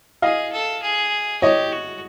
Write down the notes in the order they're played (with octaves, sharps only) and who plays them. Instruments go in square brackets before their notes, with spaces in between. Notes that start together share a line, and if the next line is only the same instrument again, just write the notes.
[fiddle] G#4 [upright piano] D#5 F5
[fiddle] A4
G#4
[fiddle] G4 [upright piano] C#5 D#5
[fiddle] F#4